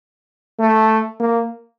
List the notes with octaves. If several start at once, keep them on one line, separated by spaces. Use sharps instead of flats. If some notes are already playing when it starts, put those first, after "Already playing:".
A3
A#3